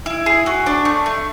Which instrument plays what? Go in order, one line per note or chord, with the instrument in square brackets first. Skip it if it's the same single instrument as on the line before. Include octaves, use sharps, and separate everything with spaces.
[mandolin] E4
G#4
F#4
D4
A3
A3